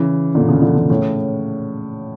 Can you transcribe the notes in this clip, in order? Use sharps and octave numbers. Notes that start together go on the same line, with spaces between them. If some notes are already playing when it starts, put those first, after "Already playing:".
Already playing: C#3 E3
A#2 D3
C#3 E3
D3 F3
C#3 E3
A2 C#3